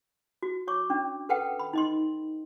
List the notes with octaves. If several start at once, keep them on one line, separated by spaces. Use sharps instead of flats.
F#4
C#5 C#6 D6
C#4 D4
A4 B4 F#5 G5
B5
D#4 D#5 C6